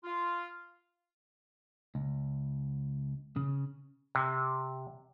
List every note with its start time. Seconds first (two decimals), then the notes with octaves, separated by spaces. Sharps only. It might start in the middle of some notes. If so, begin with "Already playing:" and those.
0.04 F4
1.95 C#2
3.36 C#3
4.15 C3